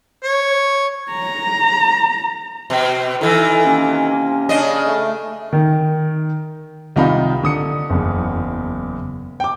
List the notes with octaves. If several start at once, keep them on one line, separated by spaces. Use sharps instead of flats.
C#5
A#5
B2 C4
D#3 E3 D#4 E4 A4
C3 A#3 C#4
C#3 D4 D#5
A3
D#3
C2 D#3 D#4 F4 B5
D3 D#6 C#7
F#1 E2
G5 D6